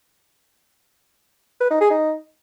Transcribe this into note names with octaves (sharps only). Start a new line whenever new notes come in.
B4
D#4
G#4
D#4